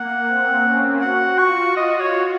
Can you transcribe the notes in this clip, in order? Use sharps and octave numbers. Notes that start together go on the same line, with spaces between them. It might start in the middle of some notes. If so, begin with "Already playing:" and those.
Already playing: A#3 F#5
C4
C#4
F#4 F#5
F4 C#6
F#4 D#5
C#5